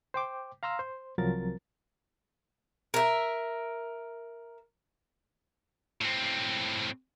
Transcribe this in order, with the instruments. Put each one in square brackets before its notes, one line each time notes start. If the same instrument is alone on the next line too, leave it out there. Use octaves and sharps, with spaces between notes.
[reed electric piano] C5 G5 D6
F5 A#5 C6 E6 F6
C5
C2 F3 F#3 C4 A#4 A6
[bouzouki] A#4 E5
[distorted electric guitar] A2 C4